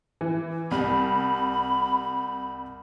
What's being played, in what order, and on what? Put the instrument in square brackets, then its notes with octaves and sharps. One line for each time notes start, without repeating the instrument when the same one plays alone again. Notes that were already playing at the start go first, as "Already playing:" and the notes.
[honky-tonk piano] E3
[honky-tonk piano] C2 G3 [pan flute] B5